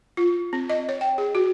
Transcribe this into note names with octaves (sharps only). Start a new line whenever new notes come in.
F4
C4
D#5
C#5
G5
G#4
F#4